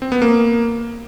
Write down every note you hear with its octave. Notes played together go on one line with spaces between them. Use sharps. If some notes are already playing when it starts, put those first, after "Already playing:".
C4
B3
A#3